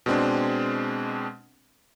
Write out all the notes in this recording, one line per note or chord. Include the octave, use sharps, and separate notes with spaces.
B2 G#3 C4 D4